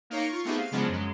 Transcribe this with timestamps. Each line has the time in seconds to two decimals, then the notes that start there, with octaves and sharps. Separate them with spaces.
0.10 A#3 D#4 A#4 C#5 F5 A#5
0.28 F4 C#6
0.45 A3 B3 C4 D#4 G4 G#4
0.57 F5
0.71 C#3 F3 F#3 G#3 B3 D4
0.88 F#2 G#3